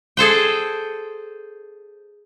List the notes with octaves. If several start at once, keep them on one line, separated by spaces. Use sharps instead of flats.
G#4 A4 C5 G5